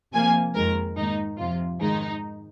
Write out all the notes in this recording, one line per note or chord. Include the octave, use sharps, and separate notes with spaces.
C3 F3 A#3 G#5
F2 D#3 G#3 A#4
G#2 D#3 A#3 D#4
F2 C3 F3 F4
G#2 D#3 G#3 D#4